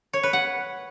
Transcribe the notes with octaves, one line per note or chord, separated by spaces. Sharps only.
C#5
B4
F#5